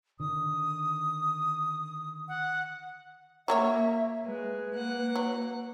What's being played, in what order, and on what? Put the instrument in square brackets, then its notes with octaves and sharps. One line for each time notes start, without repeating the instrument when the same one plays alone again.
[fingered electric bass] D3 D#3 [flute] D#6
[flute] F#5
[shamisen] F#3 A#4 C#5 [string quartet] A#3 [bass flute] E5
[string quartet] G#3 [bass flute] B4
[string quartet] A#3 F#5
[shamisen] F#3